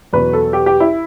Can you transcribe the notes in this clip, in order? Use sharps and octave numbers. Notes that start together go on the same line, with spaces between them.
E2 B2 F#3 B4
A4
G4
G4
E4